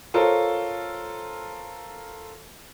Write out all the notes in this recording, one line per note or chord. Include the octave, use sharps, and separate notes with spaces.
F4 A4 A#4 C5 C#5